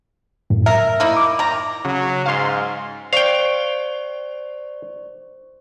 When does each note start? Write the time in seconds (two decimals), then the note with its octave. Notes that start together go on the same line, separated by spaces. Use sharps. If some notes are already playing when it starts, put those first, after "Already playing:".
0.50 F#2 A2
0.66 A#4 E5
1.00 A#3 D#4 E4
1.17 D6
1.39 D#3 A#5
1.85 C#3 F#3
2.26 G#2 F5 C6
3.13 C5 D5 F5 G5 C#6